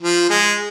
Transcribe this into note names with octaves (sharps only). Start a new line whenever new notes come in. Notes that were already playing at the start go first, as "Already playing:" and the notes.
F3
G#3